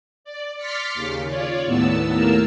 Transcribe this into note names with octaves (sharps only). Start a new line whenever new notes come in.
D5
C6 D6 F6 A6 B6 C#7
D#2 C#3
F4 C#5 D5
D#2 A2 B3 A5 E6
D#2 A2 A#3 A#4 A5 E6